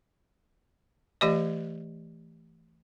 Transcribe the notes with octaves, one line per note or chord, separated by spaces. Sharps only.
E3 A3 G4 D5 D#5